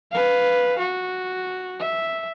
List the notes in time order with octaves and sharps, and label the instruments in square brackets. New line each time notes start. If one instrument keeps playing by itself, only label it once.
[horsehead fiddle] B4 F5
F#4
E5